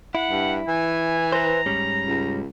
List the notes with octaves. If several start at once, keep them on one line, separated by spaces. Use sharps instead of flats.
E4 F#5
G2
E3 G#5
B4 C5 A#5
G#2 G3 C#4
C#2